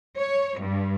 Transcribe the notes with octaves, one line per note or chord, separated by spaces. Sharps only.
C#5
G2